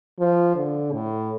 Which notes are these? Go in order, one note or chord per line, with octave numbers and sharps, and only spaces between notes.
F3
D3
A2